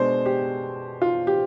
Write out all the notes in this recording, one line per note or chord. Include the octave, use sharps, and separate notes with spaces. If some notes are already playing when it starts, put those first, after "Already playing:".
Already playing: B2 G#3 D4 C5
G4
F4
G4